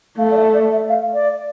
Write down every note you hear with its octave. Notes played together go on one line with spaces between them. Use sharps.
A3 F5
D5
E5
D5
E5
F5
D5